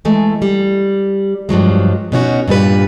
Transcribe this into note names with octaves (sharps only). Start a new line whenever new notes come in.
E3 G#3 A3
G3
G2 F3 F#3 G#3
B2 B3 C#4 D#4 F4 F#4
G2 A#2 G3 B4